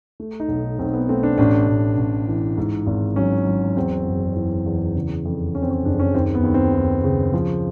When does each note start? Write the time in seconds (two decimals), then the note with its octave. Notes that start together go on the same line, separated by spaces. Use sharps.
0.20 A3
0.40 D#4
0.49 B1
0.79 B1 C4
0.93 B3
1.09 A3 C4
1.23 D4
1.38 A1 D4
1.68 A1
1.97 A1
2.28 E3
2.58 G#2
2.87 G#1
3.16 F#3 C#4
3.46 F#3
3.77 E2 C4
4.07 F#1
4.35 E3
4.66 E2
4.95 C#3
5.25 F2
5.55 F2 C#4
5.62 C4
5.70 C#4
5.85 F#1 D4
5.99 C#4
6.15 D#2 C4
6.35 B3
6.43 D#2
6.54 C4
6.73 D#2
7.04 C#3
7.34 F3